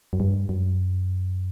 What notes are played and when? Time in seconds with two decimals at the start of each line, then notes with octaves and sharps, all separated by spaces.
0.13 F#2
0.20 G2
0.49 F#2